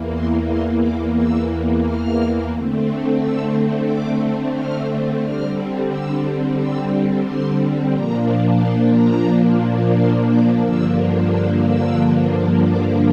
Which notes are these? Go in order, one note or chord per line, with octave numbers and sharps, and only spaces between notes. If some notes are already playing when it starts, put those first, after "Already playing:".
Already playing: E2 E3 A#3
C6
C6
D6
E6
F6
D3 A3 C4
E6
D6
F6
D3 G3 C4 F6
E6
E6
C6
A#2 F3 A#3 D4 A#5
C6
A#5
C6
D6
G2 D3 F3 A#3 D4 E6
E6
E6
D6